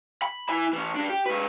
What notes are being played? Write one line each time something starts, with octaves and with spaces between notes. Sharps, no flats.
B5
E4 G#5
E3 C#4
G3 D4
G4
G#2 B4